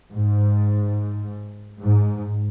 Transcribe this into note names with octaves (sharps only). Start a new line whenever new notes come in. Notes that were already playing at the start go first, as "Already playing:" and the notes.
G#2
G#2